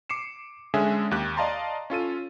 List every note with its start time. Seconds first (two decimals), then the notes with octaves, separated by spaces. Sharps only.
0.09 D6 C7 C#7 E7
0.74 D3 G#3 C#4 G#4 E5
1.11 D#2 G4 F#6
1.37 D5 D#5 F5 A5 A#5 C6
1.90 C#4 F4 A4 D#7